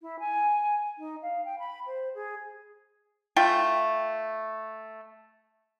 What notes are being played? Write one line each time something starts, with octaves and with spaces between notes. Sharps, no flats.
E4
G#5
D#4
F5
G5
B5
C5
G#4
A3 F4 G5